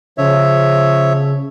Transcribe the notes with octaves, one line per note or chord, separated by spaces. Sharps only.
C#3 F3 C#5 E5